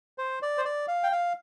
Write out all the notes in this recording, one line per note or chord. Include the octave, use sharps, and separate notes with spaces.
C5
D5
C5
D5
F5
G5
F5